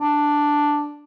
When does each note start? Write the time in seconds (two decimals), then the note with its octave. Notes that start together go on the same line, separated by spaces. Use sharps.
0.01 D4